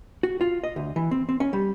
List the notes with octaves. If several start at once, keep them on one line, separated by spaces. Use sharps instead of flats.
F#4
F4
D#5
D2
E3
C4
C4
C#4
G3